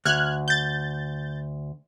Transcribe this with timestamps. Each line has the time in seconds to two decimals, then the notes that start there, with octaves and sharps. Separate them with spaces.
0.05 D2 F6 F#6 G#6
0.48 G6 A6